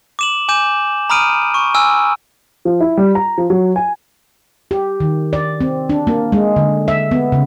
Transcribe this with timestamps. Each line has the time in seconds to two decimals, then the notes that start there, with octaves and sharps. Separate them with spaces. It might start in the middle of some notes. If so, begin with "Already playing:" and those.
0.19 D6 E7 F#7
0.48 G#5 D6 G6 E7
1.10 A#5 B5 D#6 F6 D7 D#7
1.54 C#6
1.75 G#5 E6 F6
2.65 F3
2.81 E4
2.97 G3
3.15 A#5
3.38 F3
3.50 F#3
3.76 G#5
4.71 G4
5.00 D#3
5.33 D5
5.61 C4
5.89 D4
6.07 A#3
6.32 G#3
6.56 D3
6.88 E5
7.11 B3
7.32 C#3